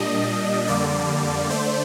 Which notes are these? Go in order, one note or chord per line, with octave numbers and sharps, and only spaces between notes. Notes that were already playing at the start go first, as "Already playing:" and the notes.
Already playing: A#2 G3 D4 D#5
F2 D3 G3 A#3 D5
D3 A3 D4 C5